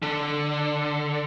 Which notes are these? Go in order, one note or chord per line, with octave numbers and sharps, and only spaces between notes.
D3